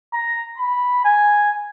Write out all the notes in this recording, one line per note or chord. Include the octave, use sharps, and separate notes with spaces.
A#5
B5
G#5